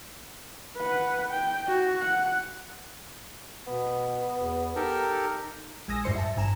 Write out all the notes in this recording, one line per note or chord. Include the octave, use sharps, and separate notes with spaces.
B4 F#5
G5
F#4
F#5
B2 B3
E2
D#4 G4 A4 A#4
A#1 G#3 G#5 D#6 E6 A#6
F#2 A2 G3 C5 C6 C#7
E5 A5
A1 G2 G#5 A#5 E7